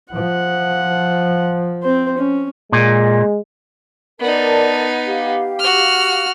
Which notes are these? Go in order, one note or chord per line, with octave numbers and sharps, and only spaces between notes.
F3 F#5
C4 C5
C#4
A#2 G#3
B3 D#4 A#4 D5 A5
G4 F5
F#4 F6